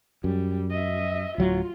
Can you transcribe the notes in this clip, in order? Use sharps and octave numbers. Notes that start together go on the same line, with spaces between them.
F#2 G3
D#5 E5
D1 F#3 F4